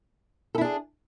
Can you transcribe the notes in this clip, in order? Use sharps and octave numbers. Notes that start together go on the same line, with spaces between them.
D4 E4 G#4 A4